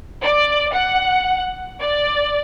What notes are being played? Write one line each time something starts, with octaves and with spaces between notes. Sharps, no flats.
D5
F#5
D5